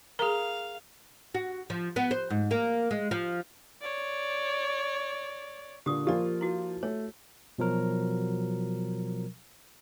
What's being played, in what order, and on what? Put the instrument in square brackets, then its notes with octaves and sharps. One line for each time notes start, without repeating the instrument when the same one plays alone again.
[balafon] G#4 A#4 [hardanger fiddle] F5 [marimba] A#5
[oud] F#4
F3
B3
C5
G#2
A#3
G#3
F3
[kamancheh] C#5 D5
[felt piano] A#2 D3 [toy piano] G4 D#6
[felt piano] F3 A#3 F4 [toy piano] G4 D5
[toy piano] E4 F#4
[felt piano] A3 [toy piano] C#5
[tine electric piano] B2 F3 F#3 A#4